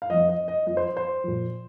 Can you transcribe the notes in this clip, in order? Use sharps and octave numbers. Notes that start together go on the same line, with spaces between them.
F5
F2 F3 D#5
D#5
D#5
F2 F3 D#5
C5
C5
A#2 F3